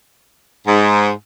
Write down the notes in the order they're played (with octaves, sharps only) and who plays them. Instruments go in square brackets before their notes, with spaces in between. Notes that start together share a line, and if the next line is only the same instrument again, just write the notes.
[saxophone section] G#2